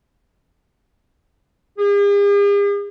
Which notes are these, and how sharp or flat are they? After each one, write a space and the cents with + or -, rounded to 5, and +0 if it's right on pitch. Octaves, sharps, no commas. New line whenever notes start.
G#4 -45